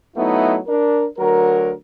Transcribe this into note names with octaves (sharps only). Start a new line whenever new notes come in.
F#3 A3 B3 D#4 E4
D4 A#4
D2 F#3 A#4